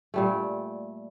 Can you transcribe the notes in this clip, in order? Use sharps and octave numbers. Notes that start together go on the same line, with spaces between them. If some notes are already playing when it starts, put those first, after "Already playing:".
A#2 G3 A3